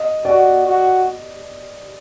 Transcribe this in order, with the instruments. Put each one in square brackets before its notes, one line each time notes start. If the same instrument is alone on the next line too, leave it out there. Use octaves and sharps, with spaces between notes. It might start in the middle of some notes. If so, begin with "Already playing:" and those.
Already playing: [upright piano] D#5
[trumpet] F#4 [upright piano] D5
[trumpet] F#4